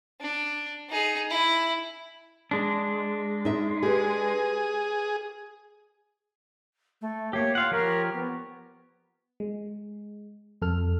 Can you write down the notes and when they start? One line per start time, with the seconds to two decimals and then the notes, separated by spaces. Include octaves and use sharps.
0.21 D4
0.90 D#4 G#4
1.30 E4
2.51 G#3 D4
3.45 D#4 E5
3.83 G4 G#4 B4
7.01 A3
7.33 A#3 G4 C#5
7.55 F4 F5 F#5
7.71 F3 G4 A#4 C#5
8.13 B3
9.40 G#3
10.62 F2 A4 F6